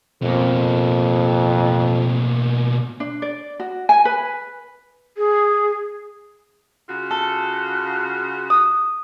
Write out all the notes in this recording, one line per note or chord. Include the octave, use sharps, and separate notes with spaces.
F2 B2 A#3
D4
D5
F#4
G#5
B4
G#4
C#3 F4 F#4
A4
D#6